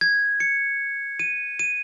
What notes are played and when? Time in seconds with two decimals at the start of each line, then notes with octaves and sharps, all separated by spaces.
0.01 G#6
0.40 C#7
1.19 D#7
1.59 D#7